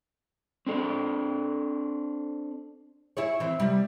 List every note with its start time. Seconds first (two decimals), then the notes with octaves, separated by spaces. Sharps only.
0.67 C4 D4 A4
3.17 E4 G#4 C#5
3.40 E3 C4
3.60 C3 G3